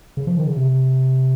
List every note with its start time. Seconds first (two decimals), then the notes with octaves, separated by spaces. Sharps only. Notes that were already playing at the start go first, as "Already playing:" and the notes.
0.17 C#3
0.27 F3
0.37 D#3
0.47 C#3
0.56 C3